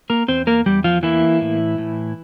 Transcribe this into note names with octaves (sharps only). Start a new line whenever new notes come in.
A#3 A#4
E2 C4 C5
A#3 A#4
E2 G3 G4
F3 F4
E3 A#3 E4
A2
A2